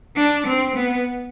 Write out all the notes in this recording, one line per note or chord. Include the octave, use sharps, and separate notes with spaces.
D4
C4
B3